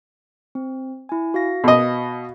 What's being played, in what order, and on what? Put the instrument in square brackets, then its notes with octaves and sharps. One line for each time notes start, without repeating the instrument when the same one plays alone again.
[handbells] C4
E4 G#5
F#4 F5 A#6
[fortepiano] B2 D#5